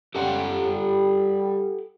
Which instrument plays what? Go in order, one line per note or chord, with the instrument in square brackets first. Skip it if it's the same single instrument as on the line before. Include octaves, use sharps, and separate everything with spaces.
[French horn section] G3 C#4 [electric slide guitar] G4 A4 F#5
[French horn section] G3